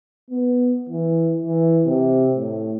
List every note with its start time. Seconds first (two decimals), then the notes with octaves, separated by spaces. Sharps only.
0.30 B3
0.89 E3
1.42 E3
1.86 C3
2.35 A2